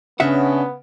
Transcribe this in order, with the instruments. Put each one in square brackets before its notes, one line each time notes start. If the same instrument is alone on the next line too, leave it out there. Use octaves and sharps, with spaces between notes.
[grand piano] C#3 [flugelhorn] B3 [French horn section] C#4 D4 [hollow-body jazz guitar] E5 F#5